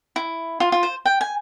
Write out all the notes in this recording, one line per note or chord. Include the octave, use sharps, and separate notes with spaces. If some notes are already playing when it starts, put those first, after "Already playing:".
E4
F4
F4
C5
G5
G#5